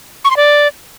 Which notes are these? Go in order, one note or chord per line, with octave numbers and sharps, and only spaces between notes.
C#6
C6
D5